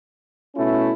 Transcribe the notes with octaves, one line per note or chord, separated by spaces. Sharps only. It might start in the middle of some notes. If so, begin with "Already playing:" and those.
B2 A3 C#4 E4